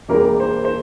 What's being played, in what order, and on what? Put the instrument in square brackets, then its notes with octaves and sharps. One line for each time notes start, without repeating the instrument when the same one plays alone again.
[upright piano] E1 E2 E3 G3 A#3 A#4
C5
C5